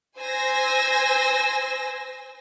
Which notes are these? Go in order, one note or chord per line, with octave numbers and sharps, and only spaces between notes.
C5 G#5 E6 A#6